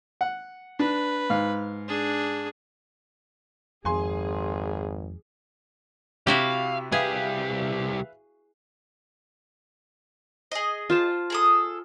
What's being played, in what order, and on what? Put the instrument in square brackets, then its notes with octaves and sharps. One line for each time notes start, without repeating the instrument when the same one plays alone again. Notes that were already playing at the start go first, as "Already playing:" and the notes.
[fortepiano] F#5
[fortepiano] D4 [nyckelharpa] B4
[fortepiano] G#2 F5
[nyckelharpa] D4 G#4
[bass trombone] G#1 [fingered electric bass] F2 [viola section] G#4 [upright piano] G#5 C6
[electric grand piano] C3 [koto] E4 F#4 G4 [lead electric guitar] F5
[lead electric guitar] C2 G4 [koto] G#4 [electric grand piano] B4 E5 F5
[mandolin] G#4 D#5
[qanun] F4 C5 A5
[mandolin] G#4 A4 D#6